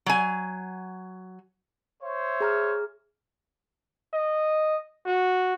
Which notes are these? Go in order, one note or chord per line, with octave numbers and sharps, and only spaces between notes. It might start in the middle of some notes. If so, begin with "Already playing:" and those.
F#3 G#5
C5 C#5 E5
G#4 A#5 F6
D#5
F#4